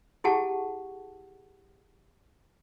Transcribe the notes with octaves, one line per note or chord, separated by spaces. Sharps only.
E4 G4 G#4 F#5 A5 C#6